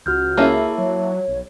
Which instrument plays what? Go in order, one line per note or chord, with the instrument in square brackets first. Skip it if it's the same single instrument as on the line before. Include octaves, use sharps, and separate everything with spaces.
[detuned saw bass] C#2 [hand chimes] F#4 F6 G6
[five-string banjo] A#3 C#4 E4 [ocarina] G#4 [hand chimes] E5 A5
[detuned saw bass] F#3 [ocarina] C#5
[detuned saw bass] B1